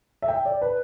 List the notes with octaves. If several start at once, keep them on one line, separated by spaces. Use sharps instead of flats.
E5
G5
D5
B4